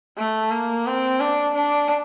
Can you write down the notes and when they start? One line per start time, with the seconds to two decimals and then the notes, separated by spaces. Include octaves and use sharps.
0.17 A3
0.51 A#3
0.86 C4
1.20 D4
1.54 D4